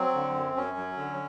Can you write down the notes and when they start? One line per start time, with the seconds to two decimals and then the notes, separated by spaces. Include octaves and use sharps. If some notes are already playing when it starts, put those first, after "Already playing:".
Already playing: F#3 C4
0.15 D3
0.35 F#2
0.56 F#2 C#4
0.77 F#3
0.97 D3